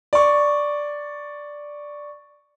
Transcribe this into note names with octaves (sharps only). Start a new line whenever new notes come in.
D5 C#6